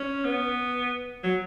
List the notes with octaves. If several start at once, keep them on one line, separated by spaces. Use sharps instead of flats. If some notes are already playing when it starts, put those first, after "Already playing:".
Already playing: C#4
B3
F#3